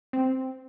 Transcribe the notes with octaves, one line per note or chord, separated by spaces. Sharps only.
C4